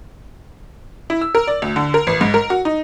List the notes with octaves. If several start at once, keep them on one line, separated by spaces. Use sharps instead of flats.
E4
E6
A#4
D5
D2
D3
A#4
A1
G#2
A#4
F#4
D#4